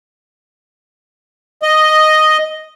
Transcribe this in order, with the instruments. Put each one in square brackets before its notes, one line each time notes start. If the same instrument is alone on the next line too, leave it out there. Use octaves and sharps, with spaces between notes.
[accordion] D#5